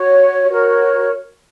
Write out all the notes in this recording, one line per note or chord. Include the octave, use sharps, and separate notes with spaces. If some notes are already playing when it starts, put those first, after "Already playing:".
Already playing: F#4 C#5
F#4 A#4 C#5